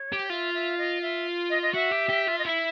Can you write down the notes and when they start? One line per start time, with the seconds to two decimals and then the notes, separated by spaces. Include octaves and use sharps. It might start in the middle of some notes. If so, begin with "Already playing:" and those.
Already playing: C#5
0.12 G4
0.30 F4 E5
0.54 E5
0.78 D#5
1.02 E5
1.50 D#5
1.62 D#5
1.74 F#4 E5
1.92 G4
2.09 G4
2.28 F4
2.39 D#5
2.45 E4 E5